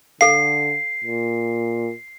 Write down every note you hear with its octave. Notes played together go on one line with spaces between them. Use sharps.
D3 A4 F5 C7
A#2